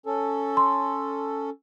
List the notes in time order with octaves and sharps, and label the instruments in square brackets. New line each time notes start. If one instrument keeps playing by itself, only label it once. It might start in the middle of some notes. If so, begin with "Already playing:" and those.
[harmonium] C#4 A4
[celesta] C6